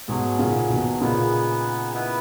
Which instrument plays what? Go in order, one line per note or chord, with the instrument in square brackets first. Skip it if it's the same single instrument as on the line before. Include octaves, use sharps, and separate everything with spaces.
[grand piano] G#2 B2 [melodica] F#3 C#4 G#4
[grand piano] A#2 C#3
B2 D#3
[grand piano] A#2 C#3 [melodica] B3 D#4 G#4 B4
[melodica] B3 E4 B4